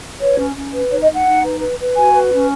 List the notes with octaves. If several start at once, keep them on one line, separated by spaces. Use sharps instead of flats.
B4 C#5
C#4
C#4
B4
D#4 C#5
D#5
D#4
F#5
D#4
B4
B4
B4
F#4 G#5
B4
C#4